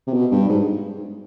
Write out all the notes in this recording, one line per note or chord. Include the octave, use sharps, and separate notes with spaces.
C3
B2
G2
G#2